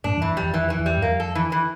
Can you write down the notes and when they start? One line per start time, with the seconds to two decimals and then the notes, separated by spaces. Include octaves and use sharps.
0.04 G2 A#2 D4
0.16 E2 G2
0.22 E3
0.29 F2
0.37 E2 G3
0.54 F2 E3
0.70 E3
0.78 E2
0.86 G3
0.97 G2
1.02 F2 A#3
1.20 A4
1.35 E3
1.52 E3